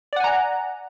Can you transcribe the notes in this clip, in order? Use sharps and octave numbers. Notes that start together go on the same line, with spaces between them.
D5 F#5 G#5 A#5